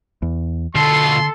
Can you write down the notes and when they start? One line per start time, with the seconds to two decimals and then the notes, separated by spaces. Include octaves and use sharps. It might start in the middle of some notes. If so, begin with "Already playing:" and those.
0.22 E2
0.75 B2 D3 F4 A4 C6